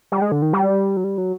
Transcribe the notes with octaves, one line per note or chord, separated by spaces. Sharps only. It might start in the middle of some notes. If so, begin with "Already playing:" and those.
G3
G#3
D3
D#3
G3
F#3
G3
F#3